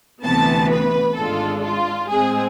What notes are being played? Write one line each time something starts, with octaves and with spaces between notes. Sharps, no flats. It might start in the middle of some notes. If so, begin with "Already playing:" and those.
D2 C3 E3 B3 A5
B4
G#1 G#2 G#3 D4 F4 A4
F4
A2 G#3 C4 G#4